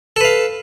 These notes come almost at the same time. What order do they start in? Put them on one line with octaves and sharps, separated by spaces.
A4 B4 F5